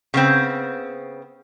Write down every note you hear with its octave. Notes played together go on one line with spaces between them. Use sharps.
C#3 B3 C4